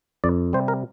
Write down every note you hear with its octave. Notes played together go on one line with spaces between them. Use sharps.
F2 D5
C3 G3 C5
A#4